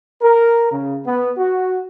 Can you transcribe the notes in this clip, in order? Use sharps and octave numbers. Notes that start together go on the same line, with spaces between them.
A#4
C#3
B3
F#4